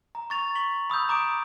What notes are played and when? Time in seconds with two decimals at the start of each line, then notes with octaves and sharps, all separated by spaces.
0.15 A#5
0.30 C#6 A6 F7
0.55 C#6 B6 F#7
0.90 B5 D#6 E6 G6
1.09 A#5 D6 D#6 D7